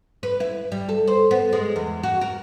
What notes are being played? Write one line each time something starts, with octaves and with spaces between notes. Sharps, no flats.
B4
E4
G3
A4
C5
B3
G#3
E2
F#4
A#4